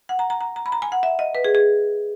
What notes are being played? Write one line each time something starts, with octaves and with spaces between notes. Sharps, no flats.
F#5
A#5
A#5
A#5
A#5
B5
A#5
G#5
F#5
E5
D#5
B4
G#4
G#4